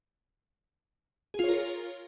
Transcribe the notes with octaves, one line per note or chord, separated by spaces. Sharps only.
F4 G#4 A#4 C#5